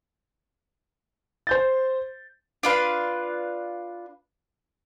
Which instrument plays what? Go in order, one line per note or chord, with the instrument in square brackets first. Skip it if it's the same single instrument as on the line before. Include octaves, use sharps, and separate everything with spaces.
[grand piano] C5 G6 A6
[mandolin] D4 F4 B4